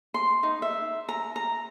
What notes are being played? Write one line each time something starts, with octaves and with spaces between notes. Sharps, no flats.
C6
D#4
E5
A#5
A#5